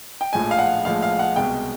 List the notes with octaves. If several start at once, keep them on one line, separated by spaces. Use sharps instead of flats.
G5
A#1 A2 F3 G#3 G#5
F5
F#5
A#1 A2 F3 G#3 F5
F5
F#5
C2 B2 G#3 G5